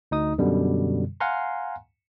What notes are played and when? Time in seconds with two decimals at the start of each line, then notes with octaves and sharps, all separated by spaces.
0.11 D2 D#4 D#6
0.38 F#2 B2 D3 G3
1.20 F5 F#5 G#5 A#5 C6